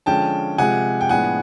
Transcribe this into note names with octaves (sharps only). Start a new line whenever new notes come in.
D3 F3 G#3 C#4 G5 A5
C3 F3 G#3 F#5 G#5
G5
A2 F3 G#3 B3 D4 F#5 G#5